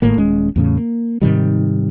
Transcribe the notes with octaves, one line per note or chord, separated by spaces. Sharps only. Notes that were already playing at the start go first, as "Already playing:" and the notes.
G#1 A2 A#3
D#1 G#3 C#4
E2 A2 C#3
A#3
G#2 C3 D#3 G3